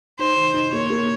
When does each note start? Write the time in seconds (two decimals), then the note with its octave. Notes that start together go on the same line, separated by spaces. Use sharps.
0.19 D#4 C5
0.36 D#3
0.54 D#4
0.72 A#3 C#5
0.90 A#3